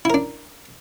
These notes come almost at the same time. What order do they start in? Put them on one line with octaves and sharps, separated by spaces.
E4 A#4 D4